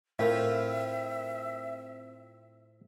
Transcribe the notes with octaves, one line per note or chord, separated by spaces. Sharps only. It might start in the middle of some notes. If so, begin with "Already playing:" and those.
A2 C4 F4 A#4 E5 F5